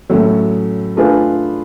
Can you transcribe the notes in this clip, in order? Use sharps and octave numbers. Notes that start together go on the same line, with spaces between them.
A2 F#3 A3 C#4
A3 D4 F4 G#4 B4